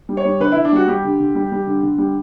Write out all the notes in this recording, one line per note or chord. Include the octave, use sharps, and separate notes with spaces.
G3
C#5
G3
D3 B4
D3 E4
D4
G3 F#4
G3 G4
D3
D3
G3
G3
D3
D3
G3